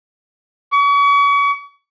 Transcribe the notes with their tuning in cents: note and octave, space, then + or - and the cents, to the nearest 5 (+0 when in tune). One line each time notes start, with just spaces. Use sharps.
C#6 +40